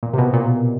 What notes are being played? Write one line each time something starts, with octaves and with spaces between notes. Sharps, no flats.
A#2
C3
B2
A#2